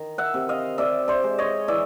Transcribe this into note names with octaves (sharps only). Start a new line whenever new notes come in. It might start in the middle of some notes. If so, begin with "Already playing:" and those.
Already playing: D#3
E5 F#5
C3
D#5 F5
C3 D5 E5
C5 D5
G#3
C#5 D#5
E3 D5 E5